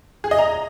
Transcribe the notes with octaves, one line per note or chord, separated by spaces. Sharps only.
G#4
D#5
A#5